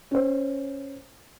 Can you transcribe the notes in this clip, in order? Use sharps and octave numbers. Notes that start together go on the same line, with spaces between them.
C#4 C5